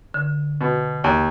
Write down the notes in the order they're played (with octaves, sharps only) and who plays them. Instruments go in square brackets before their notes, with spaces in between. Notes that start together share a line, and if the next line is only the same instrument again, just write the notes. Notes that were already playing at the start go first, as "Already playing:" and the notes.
[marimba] D3
[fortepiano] B2
D#2